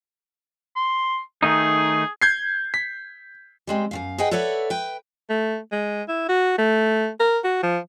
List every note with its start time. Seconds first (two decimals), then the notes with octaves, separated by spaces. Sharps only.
0.76 C6
1.43 D#3 A3 D#4 G#4
2.22 G6 G#6 C7
2.74 B6
3.67 G3 G#3 C4
3.91 F#2 C3 F5
4.18 G#4 B4 D#5 F#5 G5
4.31 A4 B4 C#5 D5 E5 F#5
4.70 B4 G5
5.29 A3
5.72 G#3
6.08 E4
6.29 F#4
6.58 A3
7.20 A#4
7.44 F#4
7.63 F3